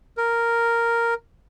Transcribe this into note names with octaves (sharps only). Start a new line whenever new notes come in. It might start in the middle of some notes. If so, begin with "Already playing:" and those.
A#4